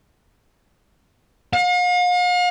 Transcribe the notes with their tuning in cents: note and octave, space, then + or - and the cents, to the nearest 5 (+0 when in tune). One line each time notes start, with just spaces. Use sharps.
F5 +45